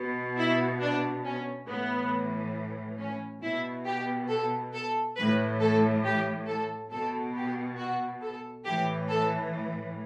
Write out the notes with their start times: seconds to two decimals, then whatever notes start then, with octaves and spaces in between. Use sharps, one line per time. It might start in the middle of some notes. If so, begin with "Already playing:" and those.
Already playing: B2
0.38 E4
0.81 D4
1.25 C#4
1.67 A2 E3 B3
2.99 C#4
3.42 B2 E4
3.86 G4
4.29 A4
4.73 A4
5.16 A2 E3 B4
5.61 A4
6.04 G4
6.47 A4
6.91 B2 A4
7.35 G4
7.78 F#4
8.22 A4
8.66 A2 E3 G4
9.09 A4